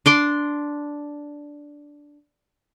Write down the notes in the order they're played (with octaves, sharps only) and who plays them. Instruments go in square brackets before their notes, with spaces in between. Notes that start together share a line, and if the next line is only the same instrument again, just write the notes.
[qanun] D4 C6 D6